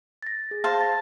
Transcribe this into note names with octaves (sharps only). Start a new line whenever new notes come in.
A6 A#6
G#4
C5 F5 A5
A6 A#6